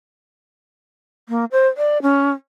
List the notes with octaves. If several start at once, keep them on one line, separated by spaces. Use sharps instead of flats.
A#3
C5
D5
C#4